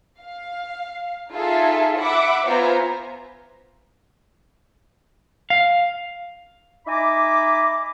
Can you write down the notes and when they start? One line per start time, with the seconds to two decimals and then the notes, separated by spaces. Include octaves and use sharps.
0.20 F5
1.31 D#4 F4 G#4 A4 E5
1.98 E5 F#5 B5 D6
2.45 B3 F4 C5 E5 G#5 A#5
5.50 F5
6.86 D#4 E5 G#5 A#5 B5 D6